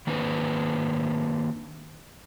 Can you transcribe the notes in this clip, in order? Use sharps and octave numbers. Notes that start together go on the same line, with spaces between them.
D#3 A#3 C4 D4 B4